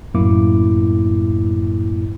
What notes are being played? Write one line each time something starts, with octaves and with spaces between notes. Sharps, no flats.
F#2 A2 F#3 A#3 E4 D6